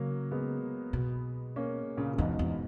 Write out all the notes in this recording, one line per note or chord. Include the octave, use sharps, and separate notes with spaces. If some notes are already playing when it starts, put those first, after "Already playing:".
Already playing: C#3 F#3 A#3
G#3 B3
B2
A#3 C#4
A#2 C#3
C#3
E2 G#2 B2
E2